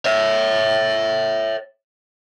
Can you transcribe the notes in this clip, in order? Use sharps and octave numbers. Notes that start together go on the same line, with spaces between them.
C#5 E5